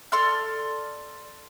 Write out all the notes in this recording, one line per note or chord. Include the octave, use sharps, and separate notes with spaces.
A4 D5 C6 F6